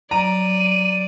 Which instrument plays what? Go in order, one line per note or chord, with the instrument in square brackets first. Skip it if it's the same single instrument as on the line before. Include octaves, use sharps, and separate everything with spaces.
[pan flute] F#3 [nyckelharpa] D5 [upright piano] A#5 [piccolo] D#7